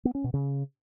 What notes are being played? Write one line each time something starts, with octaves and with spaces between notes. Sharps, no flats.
B3
C#4
B2
C#3